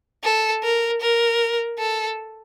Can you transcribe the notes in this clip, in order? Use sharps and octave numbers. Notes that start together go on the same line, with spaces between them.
A4
A#4
A#4
A4